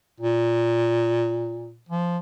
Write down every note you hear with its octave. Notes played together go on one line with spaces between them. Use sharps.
A#2
F3